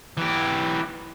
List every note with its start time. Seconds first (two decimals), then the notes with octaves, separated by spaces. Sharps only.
0.17 E3 G4